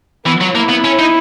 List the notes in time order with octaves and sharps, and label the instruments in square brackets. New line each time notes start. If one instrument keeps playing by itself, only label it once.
[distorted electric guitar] E3 [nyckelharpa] B3
[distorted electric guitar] F#3
[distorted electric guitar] A#3 [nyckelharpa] E4
[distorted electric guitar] B3
C#4
D#4